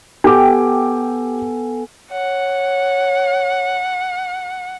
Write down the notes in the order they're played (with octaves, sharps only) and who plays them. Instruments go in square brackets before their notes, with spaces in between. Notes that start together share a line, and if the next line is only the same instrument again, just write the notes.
[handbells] B3 A4 G#5 [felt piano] G4 D6 [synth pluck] G5
[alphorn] C#5 [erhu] F#5